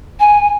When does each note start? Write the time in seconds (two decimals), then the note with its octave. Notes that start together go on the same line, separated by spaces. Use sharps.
0.20 G#5